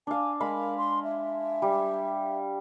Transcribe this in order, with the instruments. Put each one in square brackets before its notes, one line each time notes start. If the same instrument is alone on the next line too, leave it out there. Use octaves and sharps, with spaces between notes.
[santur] D4 F5 [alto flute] G#5
[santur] G#3 F5 B5 [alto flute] A#4
[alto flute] C6
E5
[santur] G3